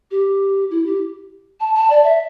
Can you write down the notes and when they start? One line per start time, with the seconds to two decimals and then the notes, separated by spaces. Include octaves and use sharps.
0.11 G4
0.71 E4
0.86 G4
1.60 A5
1.75 A5
1.90 D5
2.04 E5